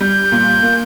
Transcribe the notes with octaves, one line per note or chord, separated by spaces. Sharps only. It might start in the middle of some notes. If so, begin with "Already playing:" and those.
G3 G6
A#2
A#3